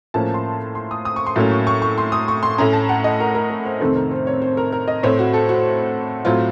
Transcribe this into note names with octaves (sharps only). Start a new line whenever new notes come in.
A2 F3 A#3 C#4 A5
C6
C6
D#6
D#6
C#6
C6
A2 F#3 A#3 C#4
C#6
C#6
C#6
C6
D#6
C#6
C6
A2 A3 C#4 A#5
A5
F#5
D#5
A#4
A#4
A#4
C5
F2 C3 D#3 A3 C4 A4
C5
A#4
C5
C#5
C5
A#4
A#4
D#5
A2 A3 C4 C#5
F#4
A4
F#4
A2 F#3 C4 F4